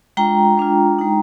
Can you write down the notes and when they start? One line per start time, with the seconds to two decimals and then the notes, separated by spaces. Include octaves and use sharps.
0.17 G#3 D4 F4 G5 A#5
0.57 G#3 D4 F4
0.99 G#3 D#4